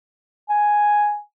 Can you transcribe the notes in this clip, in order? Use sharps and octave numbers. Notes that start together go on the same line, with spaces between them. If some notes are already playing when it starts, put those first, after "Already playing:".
G#5